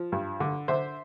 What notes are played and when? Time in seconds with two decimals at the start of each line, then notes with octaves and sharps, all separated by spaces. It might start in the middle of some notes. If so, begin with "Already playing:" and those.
Already playing: F3
0.12 G2
0.40 D3
0.68 D3 C5 E5